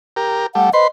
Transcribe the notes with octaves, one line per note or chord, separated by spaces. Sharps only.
G4 A#4
G3 A3 F#5
B4 C5 D#5 C6